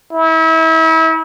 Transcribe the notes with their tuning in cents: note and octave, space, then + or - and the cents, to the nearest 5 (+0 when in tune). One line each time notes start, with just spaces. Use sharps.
E4 -35